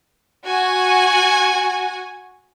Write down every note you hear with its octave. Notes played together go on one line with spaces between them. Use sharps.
F#4 G#5